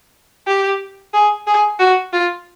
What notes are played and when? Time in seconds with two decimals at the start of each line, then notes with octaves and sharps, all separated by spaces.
0.47 G4
1.14 G#4
1.47 G#4
1.79 F#4
2.13 F4